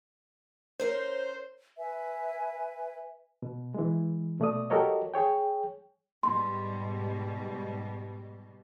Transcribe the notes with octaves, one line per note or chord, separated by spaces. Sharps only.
C#4 A#4 C5 C#5
B4 E5 G#5
B2
E3 G#3
B2 A3 D5 D#6
F#4 G4 A4 A#4 C#5 D#5
G#4 C#5 G5
G#2 B2 G3 C6